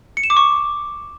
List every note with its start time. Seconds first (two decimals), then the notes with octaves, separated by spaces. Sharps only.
0.17 C#7
0.23 E7
0.30 D6
0.37 C#6